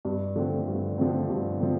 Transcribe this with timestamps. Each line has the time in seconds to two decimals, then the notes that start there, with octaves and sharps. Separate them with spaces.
0.05 G2
0.36 D3 F3 A3 C4
0.67 G2
0.98 D3 F3 A3 C4
1.30 G2
1.60 F3 A3 C4